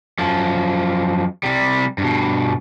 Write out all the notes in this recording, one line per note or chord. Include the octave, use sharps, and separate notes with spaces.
F#2 F3
C3 G3
G2 B2